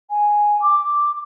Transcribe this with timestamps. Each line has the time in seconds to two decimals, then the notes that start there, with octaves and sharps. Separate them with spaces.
0.10 G#5
0.61 D6